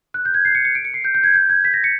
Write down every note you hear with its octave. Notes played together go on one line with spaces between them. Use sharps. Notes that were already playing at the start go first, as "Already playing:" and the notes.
F#6
G6
G#6
C7
C#7
C#7
D7
C#7
C7
G6
G6
G#6
G6
G#6
B6
A#6
C#7